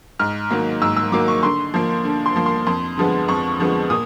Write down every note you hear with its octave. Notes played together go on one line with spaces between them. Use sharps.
G#2 F6
D#3 F#3 A#3
G#2 E6
E6
D#3 F#3 A#3 D6
C#6
D3 C6
F3 A#3
D3
C6
F3 A#3
C6
F2 C6
D3 F3 G#3 B3
F2 C#6
D3 F3 G#3 B3
A#2 D#6